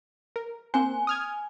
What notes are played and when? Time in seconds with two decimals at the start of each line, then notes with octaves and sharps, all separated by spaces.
0.36 A#4
0.74 A#3 C4 C5 G#5
1.07 D#6 F6 G#6